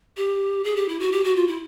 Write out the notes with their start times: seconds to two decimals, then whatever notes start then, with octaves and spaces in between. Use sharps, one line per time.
0.17 G4
0.64 G#4
0.76 G4
0.89 E4
1.00 F#4
1.12 G4
1.24 F#4
1.36 F4
1.47 E4